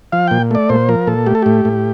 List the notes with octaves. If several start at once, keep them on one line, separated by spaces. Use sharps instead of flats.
F3 F5
A#2 G5
A3 D5
A#2 C5
F3 A#4
A#2 A4
A3 G4
A4
A2 G4
A2